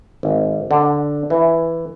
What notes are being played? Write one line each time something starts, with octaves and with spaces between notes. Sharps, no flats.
G#1
D3
E3